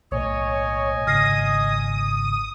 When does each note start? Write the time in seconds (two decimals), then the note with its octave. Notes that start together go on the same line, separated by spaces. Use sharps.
0.12 B1 A2 C#5 D#5 G#5
1.07 G#1 C#3 D#6 F6 A#6 C7